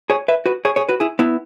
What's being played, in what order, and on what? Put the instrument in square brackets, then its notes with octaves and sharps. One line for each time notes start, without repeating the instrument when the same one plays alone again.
[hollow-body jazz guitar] G#4 C#5
B4 E5
F#4 B4
G#4 C#5
G#4 C#5
F#4 B4
E4 G#4
B3 E4